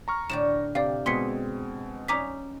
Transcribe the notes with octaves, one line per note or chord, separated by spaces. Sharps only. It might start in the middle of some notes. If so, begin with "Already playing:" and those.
A#5 C#6 F6
A2 D3 G4 E7
C3 G4 D5 F5
B2 G#3 C4 G#4 C6 B6 C#7
F#3 C#4 D#4 A#5 D6 B6